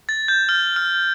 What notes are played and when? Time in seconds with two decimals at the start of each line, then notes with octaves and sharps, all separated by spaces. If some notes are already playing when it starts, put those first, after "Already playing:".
0.09 A6
0.28 G6
0.49 F6
0.76 F6